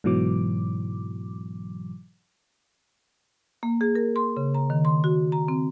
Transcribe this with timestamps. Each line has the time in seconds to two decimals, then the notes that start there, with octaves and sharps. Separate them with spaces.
0.04 G#2 B2 E3 F#3 D6
3.63 A#3
3.81 G#4
3.95 A#4
4.16 C6
4.37 C#3
4.54 A#5
4.70 D#3
4.85 C6
5.04 F#4
5.32 A#5
5.48 C4